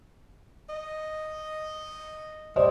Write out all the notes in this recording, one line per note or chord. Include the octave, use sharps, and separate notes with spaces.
D#5
G3 C5 D5 D#5